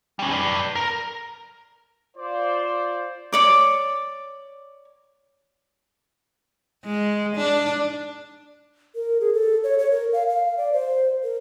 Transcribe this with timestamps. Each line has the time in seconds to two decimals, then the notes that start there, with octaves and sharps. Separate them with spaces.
0.19 G3 C#4
0.31 B4 D5
0.75 A#4
2.17 F4 C5 D5
3.32 C#5 D5 D6
6.84 G#3
7.36 D4
8.95 A#4
9.21 G#4
9.33 A4
9.64 C#5
9.79 C#5
9.91 A#4
10.13 F5
10.29 F5
10.57 D5
10.73 C5
11.23 A#4